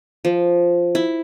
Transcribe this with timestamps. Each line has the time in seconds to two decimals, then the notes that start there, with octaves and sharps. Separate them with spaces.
0.25 F3
0.95 E4